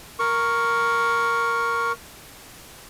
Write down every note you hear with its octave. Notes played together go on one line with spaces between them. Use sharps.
A#4 C#6